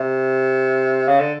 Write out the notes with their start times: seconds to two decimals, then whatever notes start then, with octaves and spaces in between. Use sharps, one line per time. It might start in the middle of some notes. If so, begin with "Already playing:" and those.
Already playing: C3
1.08 C#3
1.20 D3